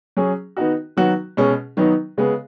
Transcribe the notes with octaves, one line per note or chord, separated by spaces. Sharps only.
F#3 C#4 G#4
D#3 B3 D#4 F#4
D#3 F#3 B3 F#4
B2 G#3 C#4 G#4
D#3 F#3 B3 D#4
C#3 G#3 B3 G#4